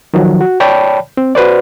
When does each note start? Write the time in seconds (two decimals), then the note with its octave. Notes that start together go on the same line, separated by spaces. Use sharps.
0.14 D#3 F3 F#3
0.41 F#4
0.60 C#5 D5 G5 A5 B5
1.17 C4
1.35 F#4 B4 C5 D5